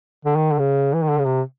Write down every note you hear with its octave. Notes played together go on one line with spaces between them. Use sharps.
D3
D#3
D3
C#3
E3
D#3
D3
C#3
C3